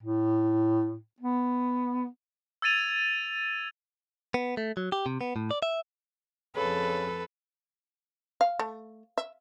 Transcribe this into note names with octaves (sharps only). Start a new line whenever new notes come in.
A2
B3
E6 G#6 A6 D#7 F7
B3
A3
F#3
G4
C3
B3
A2
D5
E5
F2 C#3 A4 B4
F5
A3
E5